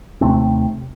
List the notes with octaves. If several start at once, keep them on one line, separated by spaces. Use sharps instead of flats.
D#2 C3 A3 C4